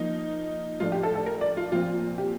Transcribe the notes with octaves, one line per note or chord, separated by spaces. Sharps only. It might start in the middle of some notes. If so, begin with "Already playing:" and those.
Already playing: F3 A#3 D#4
A2 F3 A3 D4 F4
G4
A4
A4
A#4
D5
F4
A#2 F3 C4 F4
G4